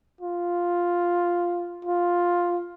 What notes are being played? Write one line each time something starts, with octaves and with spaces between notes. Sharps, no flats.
F4
F4